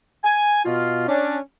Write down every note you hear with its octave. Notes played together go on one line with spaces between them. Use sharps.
G#5
B2 F4
C#4 D4